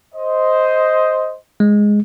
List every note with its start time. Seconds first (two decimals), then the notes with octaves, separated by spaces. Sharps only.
0.14 C5 D#5
1.60 G#3